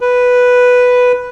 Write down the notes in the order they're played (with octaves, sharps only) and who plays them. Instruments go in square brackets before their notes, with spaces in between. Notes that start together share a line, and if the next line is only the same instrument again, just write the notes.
[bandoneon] B4